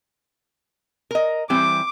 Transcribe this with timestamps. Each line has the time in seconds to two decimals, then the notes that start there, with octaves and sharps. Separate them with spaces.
1.11 A#4 D#5
1.50 E3 G3 C4 D6